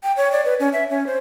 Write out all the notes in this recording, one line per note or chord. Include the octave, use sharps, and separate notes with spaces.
G5
C#5
D5
B4
C#4
E5
C#4
C5